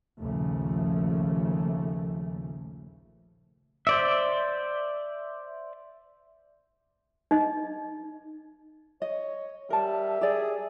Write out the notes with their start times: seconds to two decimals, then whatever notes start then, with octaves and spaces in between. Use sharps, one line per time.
0.21 A#1 D#2 C#3 F3 A3
3.87 C5 D5 E5
7.31 D#4 D#5
9.02 C#5 D#5
9.70 G3 A#4 E5 A5
10.21 G4 G#4 D5